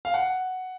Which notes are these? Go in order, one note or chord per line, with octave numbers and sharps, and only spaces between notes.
F5
F#5